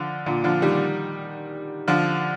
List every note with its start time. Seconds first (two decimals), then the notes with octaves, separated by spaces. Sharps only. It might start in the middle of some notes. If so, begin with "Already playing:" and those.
Already playing: D3 F3
0.26 A#2 D3
0.44 D3 F3
0.62 D#3 G3
1.88 D3 F3